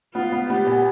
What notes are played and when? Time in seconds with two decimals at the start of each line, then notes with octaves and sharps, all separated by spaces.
0.14 B3 F4
0.32 B3
0.49 B3 G4
0.67 A#2